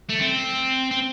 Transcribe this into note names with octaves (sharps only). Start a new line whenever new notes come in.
A3
C4
C4